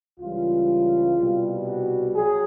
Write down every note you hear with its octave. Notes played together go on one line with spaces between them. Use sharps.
C#2 C#3 E3 G3 F4
C2 B2 G3
F#4
F#3 G#4